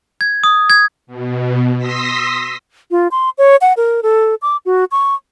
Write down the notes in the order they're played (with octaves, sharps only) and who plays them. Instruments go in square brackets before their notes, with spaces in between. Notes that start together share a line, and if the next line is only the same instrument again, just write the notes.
[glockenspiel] G#6
D#6
G#6
[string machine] B2
C6 D#6 E6 A#6 B6
[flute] F4
C6
C#5
F#5
A#4
A4
D6
F#4
C#6